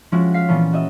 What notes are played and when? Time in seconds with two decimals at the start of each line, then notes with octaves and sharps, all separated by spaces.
0.12 F3 G#3 C#4 E4 F#4
0.34 F5 B6 C7
0.48 A#2 E3 B3 C#4 A4
0.72 F#4 D#5 E5